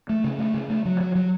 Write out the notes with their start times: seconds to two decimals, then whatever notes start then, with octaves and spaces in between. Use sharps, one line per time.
0.09 A3
0.24 C#3
0.39 A3
0.54 C#3
0.70 A3
0.85 F#3
1.00 F#3
1.15 F#3